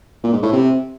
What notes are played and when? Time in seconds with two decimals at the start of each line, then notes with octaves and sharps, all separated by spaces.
0.23 A#2
0.33 G#2
0.43 A2
0.52 C3